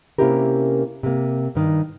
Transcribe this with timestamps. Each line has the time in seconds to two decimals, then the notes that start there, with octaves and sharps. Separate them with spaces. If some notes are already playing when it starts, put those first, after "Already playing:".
0.18 C3 A#3 C#4 E4 G4 A#4
1.03 C3 A#3
1.55 G2 D#3